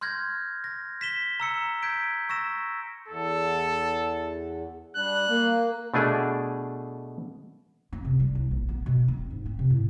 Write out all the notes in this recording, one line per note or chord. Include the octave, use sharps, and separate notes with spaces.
C6 F6 G6 G#6 A#6
A#6
B6 E7 G7
A#5 E6 C#7
G6 G#6 B6 D7
C#6 E6 A#6 E7
E2 A4
G3 D4 F#6
A#3
B2 A3 D4 G#4
C4
C3
G3
C2
A#1
B3
B2
C4
G#2
C4
C3
A2